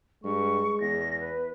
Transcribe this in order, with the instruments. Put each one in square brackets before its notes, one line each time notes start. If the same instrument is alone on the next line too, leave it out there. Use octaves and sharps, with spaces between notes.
[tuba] G2 [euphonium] G#3 [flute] C#6
[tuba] E2 [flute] A#6
[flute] B4